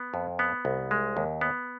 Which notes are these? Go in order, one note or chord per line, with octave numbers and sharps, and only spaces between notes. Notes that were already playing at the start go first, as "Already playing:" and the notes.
Already playing: B3
F2
B3
C2
G#3
D#2
B3